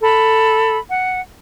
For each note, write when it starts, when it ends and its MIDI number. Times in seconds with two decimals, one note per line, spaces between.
0.01 0.76 69
0.01 0.76 83
0.87 1.19 78